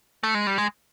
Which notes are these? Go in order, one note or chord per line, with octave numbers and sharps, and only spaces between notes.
A3
G#3
G3
G#3